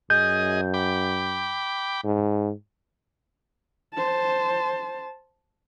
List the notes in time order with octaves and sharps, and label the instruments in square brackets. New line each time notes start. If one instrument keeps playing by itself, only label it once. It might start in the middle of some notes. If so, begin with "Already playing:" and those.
[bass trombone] F#2 [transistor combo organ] G#4 D#5 [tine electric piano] G6
[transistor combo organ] G5 B5 D6
[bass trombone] G#2
[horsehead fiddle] C5 A5